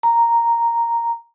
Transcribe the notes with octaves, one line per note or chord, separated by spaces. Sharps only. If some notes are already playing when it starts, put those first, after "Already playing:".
A#5